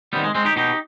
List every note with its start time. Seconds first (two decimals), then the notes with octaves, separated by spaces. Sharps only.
0.13 C3 D#3 G3 B3
0.24 G#3
0.35 G#3 C4
0.45 D#4 G4
0.56 B2 D#4 G4